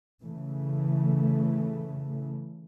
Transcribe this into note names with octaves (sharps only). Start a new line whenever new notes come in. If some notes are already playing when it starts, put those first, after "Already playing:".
C#3 E3 A3